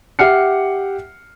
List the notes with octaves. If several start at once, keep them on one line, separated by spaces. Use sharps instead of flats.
G4 E5 F#5 F6 C7 C#7